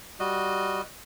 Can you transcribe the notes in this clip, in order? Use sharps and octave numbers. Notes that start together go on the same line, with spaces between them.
G3 F#4 D#5